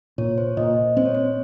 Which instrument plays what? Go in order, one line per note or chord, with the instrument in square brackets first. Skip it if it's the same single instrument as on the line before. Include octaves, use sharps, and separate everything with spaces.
[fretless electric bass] A#2 [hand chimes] C#5
[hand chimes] C5
[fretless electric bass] A#2 [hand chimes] D#5
[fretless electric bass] C4 [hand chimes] C5
[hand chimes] C#5
C5